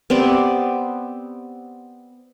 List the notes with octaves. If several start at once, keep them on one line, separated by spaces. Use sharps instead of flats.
B3 C4 G4 D5